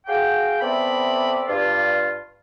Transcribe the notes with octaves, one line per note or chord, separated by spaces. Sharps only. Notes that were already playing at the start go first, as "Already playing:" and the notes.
F#4 G#4 F5 G5
A3 B3 C4 D5 E5 B5
G2 F4